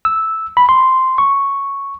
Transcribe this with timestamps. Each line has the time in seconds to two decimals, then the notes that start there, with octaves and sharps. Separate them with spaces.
0.05 E6
0.57 B5
0.69 C6
1.18 C#6